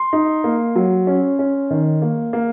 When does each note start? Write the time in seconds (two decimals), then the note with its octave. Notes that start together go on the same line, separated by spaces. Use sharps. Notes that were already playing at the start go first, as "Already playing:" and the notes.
Already playing: C6
0.13 D#4
0.44 A#3
0.76 F#3
1.07 C#4
1.39 C#4
1.70 D#3
2.02 A#3
2.33 A#3